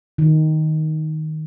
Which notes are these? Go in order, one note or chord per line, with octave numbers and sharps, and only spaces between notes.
D#3